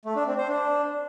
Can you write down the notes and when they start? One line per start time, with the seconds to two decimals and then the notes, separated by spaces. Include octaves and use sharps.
0.05 A3
0.16 D4
0.27 C4
0.38 C5
0.49 D4